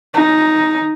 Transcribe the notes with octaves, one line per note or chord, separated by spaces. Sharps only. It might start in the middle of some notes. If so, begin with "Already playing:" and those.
D#4